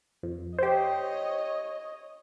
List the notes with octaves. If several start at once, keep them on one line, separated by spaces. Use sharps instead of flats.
F2
G4 C5 C#5 D#5